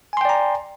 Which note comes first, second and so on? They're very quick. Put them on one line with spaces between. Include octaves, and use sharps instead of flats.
G#5 C6 G5 D5 A#5